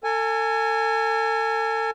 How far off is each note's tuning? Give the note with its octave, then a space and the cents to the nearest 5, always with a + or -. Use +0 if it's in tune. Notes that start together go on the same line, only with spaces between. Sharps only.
A4 +35 G#5 +0